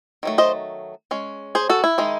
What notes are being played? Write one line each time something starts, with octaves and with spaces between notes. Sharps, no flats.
D#3 F#3 A3
C5 D#5
G#3 C#4
G#4 C5
F#4 A4
E4
D#3 G#3 D#4